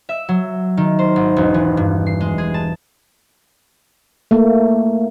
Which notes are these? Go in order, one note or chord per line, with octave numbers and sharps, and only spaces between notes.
E5
F#3
D#3
C5
G#1
E1
E3
G2
C7
G#3
G#4
A5
A3 A#3